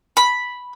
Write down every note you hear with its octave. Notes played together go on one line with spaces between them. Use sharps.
B5